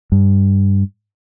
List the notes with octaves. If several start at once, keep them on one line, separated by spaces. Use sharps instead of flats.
G2